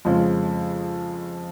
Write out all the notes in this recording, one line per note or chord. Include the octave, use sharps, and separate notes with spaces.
F2 C#3 F3 G#3 F4